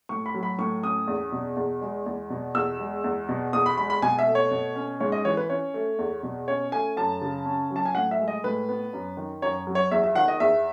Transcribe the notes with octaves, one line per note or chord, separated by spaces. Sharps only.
A2 C#6
B5
F#3
B5
A2 C#6
C#4 D#6
E2
B2
E2
G#3
E2
B2
E2 E6
G#3
E2
B2
E2 D#6
B5
G#3 B5
B5
B2 G#5
E5
A3
C#5
B2
C#4
G#2 C#5
D#5
E3 C#5
B4
C#4 C#5
A3
E2
B2
C#4 C#5
A3 G#5
F#2 A5
C#3
C#4
F#3
A5
G#5
A2 F#5
E5
G#3
D#5
A2 B4
B3
F#2
D#3
F#2 C#5
F#3
C#5
E2 E5
E5
D#3 F#5
D#5
E2 E5